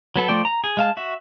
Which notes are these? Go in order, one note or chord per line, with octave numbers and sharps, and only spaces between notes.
F#3 B3 A4
F3 A3 D5 G5
A#5
G#4
G#3 F5 A5
F#4 E5